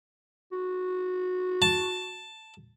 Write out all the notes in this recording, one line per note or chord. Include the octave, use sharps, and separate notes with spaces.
F#4
A5